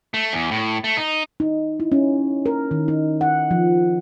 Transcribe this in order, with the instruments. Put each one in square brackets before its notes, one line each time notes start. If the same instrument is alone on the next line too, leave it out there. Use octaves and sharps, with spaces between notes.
[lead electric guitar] A3
E2
A2
A3
D#4
[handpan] D#4
E4
C#4
A#4
D#3
D#4
F#5
F3